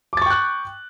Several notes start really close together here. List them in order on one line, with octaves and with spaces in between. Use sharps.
D6 A6 C#6 G5 F#6